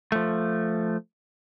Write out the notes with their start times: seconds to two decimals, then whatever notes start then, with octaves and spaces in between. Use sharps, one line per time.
0.12 F3 A3